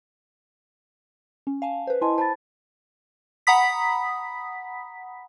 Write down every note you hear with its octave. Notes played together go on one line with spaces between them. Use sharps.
C#4
F5 G#5 A5
B4 C5
E4 D#5 G#5 A5 C6
C5 A5 B5 A6
F#5 A#5 B5 D#6 B6